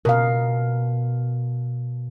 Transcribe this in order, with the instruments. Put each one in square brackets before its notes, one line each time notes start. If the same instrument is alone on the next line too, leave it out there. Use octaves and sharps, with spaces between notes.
[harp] B2 [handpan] A#4 F5